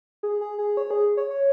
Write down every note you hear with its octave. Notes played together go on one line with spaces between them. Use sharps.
G#4
G#4
G#4
C#5
G#4
C#5
C#5